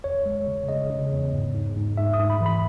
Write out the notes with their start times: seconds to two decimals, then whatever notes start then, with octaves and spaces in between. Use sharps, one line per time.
0.04 E2 C#5
0.26 G#3
0.47 C#3
0.69 C#3 D#5
0.90 C#3
1.12 E2
1.33 G#2
1.55 G#2
1.76 G#2
1.97 G#2 E5
2.14 D#6
2.19 G#2
2.30 B5
2.40 E3
2.46 B5